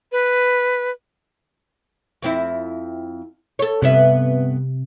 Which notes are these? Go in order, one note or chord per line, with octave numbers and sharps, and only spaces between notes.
B4
F2 C4 E4
A4 C#5
G2 C3 B3 E5